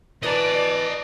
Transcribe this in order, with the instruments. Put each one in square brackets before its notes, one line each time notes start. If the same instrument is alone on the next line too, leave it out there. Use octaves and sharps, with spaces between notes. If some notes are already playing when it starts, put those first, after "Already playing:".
[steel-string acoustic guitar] E3 B4 A#5 [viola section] D5 [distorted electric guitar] D#5 A5